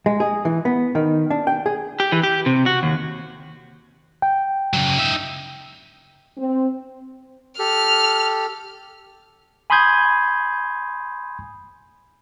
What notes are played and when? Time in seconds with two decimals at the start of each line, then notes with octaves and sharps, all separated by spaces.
0.06 G#3
0.20 G#4
0.45 E3
0.65 B3
0.95 D#3
1.30 D4
1.47 G5
1.66 G#4
2.00 G4
2.12 E3
2.23 G4
2.46 C3
2.66 F#4
2.83 D#2
4.22 G5
4.73 C#3 F#3
4.98 D#4 E5
6.38 C4
7.59 G4 A4 F6
9.70 G#5 B5 C6 D#6 G6 G#6